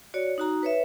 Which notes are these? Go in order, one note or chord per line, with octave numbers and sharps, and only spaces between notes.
F#4 C#5 D5
D#4 F#4 A#5
B4 C#5 E5